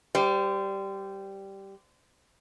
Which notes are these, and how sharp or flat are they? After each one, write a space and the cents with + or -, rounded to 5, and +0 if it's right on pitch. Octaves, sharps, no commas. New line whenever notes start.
G3 -5 C5 -30